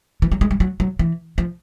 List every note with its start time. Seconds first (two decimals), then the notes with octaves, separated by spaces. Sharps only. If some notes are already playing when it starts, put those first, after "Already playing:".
0.22 E3
0.32 F#3
0.41 G#3
0.51 G3
0.60 F#3
0.80 F#3
0.99 E3
1.38 F3